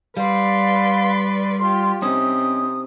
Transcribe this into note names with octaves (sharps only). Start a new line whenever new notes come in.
G3 B4 D5 F5 C6
F4 G4 C6
C3 C4 C#4 D#4 D#6